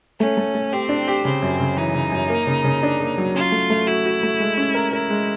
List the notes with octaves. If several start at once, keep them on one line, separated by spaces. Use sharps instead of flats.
A3 C#4
A3
A3
C4 G4
D4
G4
C#3 C4
F#2
C#3
E3 D#4
C#3
F#2
A#3
C#3
C#3
D4
A#3
F#3
C#4 F4
A3
A3
E4 F#4
F#4
A3
G#3
C#4
A#4
E4 A#4
G#3